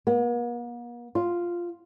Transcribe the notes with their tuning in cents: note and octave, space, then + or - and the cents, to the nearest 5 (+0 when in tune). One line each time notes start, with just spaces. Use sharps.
A#3 +45
F4 -5